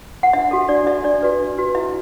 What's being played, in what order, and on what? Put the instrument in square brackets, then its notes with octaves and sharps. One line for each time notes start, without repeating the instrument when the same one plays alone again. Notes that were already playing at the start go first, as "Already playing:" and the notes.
[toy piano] F#5
D4 E5
F#4 A4
D4 D5
F#4 A4 E5
D4 D5
F#4 B4
D4
F#4 B4
E4 E5